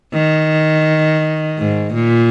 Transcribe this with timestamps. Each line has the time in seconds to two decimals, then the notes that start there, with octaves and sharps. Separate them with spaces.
0.13 D#3
1.58 G#2
1.94 A#2